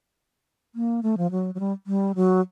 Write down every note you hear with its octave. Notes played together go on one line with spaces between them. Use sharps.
A#3
A3
F3
F#3
F#3
G3
G3
F#3